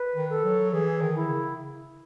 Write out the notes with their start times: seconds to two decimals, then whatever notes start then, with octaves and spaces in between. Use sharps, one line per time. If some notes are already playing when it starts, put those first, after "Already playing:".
Already playing: B4
0.16 D#3
0.30 A4
0.44 F#3
0.72 E3 G#4
1.01 D#3
1.16 E4
1.30 C#3